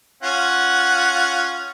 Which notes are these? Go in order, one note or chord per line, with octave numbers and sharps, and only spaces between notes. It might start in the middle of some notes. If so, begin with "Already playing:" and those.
C#4 F4 F#5